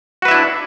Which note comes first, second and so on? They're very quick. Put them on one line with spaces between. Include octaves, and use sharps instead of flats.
F#4 B4 E5 E4 D4